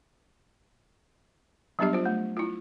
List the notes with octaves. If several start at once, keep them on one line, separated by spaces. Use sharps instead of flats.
F#3 G3 B3 D4 G4 D#5
F4 C5
A3
E4 F4